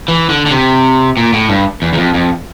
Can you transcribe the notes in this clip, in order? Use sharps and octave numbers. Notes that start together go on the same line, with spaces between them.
E3
D3
D3
C3
A#2
A2
G2
E2
E2
F2
F2